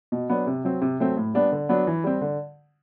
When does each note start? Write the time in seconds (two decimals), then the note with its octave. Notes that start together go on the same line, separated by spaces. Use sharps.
0.12 B2
0.30 F#3 B3 D4
0.47 C3
0.64 F#3 C4
0.82 C3
1.00 F#3 A3 C4
1.17 A2
1.34 G3 B3 D4
1.52 D3
1.69 F#3 B3 D4
1.87 E3
2.04 G3 C4
2.21 D3